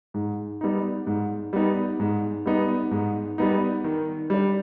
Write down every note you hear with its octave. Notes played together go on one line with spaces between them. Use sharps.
G#2
G3 B3 D#4
G#2
G3 B3 D#4
G#2
G3 B3 D#4
G#2
G3 B3 D#4
D#3
G3 D4